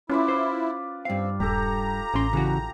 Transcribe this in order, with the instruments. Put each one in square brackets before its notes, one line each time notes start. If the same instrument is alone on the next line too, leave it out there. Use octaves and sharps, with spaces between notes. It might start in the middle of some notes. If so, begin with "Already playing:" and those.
[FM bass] C#4 [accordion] E4 [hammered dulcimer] F4 B4 D5
[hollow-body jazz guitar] C5
[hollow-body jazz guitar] G2 F5 [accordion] C4
[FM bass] D#1 [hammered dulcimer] G4 A4 [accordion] A#5
[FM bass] A1 [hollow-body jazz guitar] C#4 C6
[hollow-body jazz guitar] C#3 E3 F#4